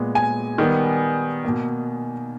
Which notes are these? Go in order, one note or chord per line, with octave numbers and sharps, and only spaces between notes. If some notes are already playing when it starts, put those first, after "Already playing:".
Already playing: A#2 G#3 B3
G#5
D#3 G3 B3
B2 A#3